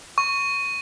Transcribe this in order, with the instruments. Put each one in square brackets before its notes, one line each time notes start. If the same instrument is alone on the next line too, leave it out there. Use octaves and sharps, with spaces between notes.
[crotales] C#6